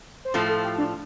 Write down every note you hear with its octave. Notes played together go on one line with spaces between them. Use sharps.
C5
A2 F3 A3 F4 A4
A4
G4
D4